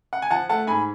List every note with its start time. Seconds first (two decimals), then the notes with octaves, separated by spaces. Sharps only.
0.13 F#5
0.22 G#5
0.31 F3 F#5 A5
0.49 A3 F#5 A5
0.67 G#2 G#5 B5